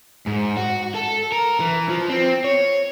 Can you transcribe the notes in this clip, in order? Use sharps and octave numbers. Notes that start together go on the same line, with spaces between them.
G#2
F#4
A4
A#4
E3
F3
C4
C#5